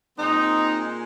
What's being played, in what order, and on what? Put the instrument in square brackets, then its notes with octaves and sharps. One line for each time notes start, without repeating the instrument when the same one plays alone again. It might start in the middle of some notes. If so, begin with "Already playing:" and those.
[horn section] A#2 G#3 C4 D#4